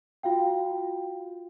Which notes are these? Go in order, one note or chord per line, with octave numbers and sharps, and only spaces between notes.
F4 F#4 F5 G5